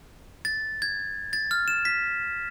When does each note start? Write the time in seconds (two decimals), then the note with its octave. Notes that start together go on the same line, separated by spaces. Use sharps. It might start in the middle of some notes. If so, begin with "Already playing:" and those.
0.45 A6
0.82 G#6
1.33 A6
1.51 F6
1.68 E7
1.85 B6